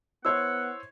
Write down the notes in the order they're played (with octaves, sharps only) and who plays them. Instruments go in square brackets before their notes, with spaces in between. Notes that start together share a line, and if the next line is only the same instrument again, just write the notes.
[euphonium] B3 [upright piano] E4 C5 C#5 [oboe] F#5 [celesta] E6